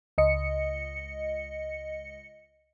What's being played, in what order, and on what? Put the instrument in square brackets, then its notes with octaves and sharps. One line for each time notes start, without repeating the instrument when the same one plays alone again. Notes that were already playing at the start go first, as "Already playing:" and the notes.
[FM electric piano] C#2 D#5 C#7